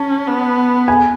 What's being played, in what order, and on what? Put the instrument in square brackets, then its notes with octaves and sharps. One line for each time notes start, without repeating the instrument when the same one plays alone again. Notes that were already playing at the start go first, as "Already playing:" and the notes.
Already playing: [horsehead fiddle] C#4 [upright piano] A5
[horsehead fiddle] B3
[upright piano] G#5